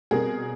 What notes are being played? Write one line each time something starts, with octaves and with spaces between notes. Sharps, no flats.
B2 G3 C4 G#4 A#4